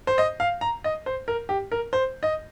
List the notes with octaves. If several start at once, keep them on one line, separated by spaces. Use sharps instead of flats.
C5
D#5
F5
A#5
D#5
C5
A#4
G4
A#4
C5
D#5